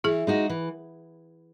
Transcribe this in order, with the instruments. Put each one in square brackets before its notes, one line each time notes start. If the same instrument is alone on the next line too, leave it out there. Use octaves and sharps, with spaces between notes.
[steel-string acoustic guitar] E3 [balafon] E4 G#4
[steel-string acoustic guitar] G#3 D#4 F#4
E3